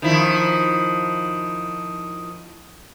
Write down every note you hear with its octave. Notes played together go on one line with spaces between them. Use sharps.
D#3 F3 E4